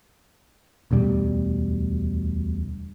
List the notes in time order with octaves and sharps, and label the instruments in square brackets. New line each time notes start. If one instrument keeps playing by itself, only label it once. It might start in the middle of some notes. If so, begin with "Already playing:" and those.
[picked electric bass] E1 D2 B2 G3